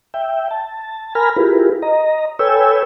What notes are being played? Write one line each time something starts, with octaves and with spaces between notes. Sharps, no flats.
E5 G5
A5
A#4 G#5 A#5 B5 F6
E4 F4 G4 G#4 A#4 B4
D#5 A#5
A4 B4 C#5 G5 G#5 E6